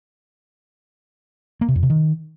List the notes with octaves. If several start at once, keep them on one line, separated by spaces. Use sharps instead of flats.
A#3
C3
F2
C3
D#3